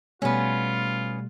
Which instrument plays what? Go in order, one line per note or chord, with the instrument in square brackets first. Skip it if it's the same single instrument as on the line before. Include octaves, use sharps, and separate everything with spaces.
[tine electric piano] B2 G3 A3 [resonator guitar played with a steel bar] B3 C#4 [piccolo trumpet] F4